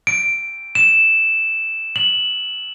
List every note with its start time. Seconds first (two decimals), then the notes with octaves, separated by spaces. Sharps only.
0.07 D7
0.75 E7
1.96 F#7